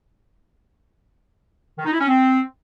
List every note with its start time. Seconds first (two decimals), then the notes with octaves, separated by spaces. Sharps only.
1.78 D#3
1.85 D#4
1.93 E4
2.00 C#4
2.08 C4